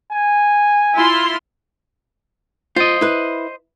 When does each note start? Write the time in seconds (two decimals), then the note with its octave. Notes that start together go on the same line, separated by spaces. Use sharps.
0.13 G#5
0.93 E4 F4 C6
2.76 F4 C5 D#5
3.01 E4 B4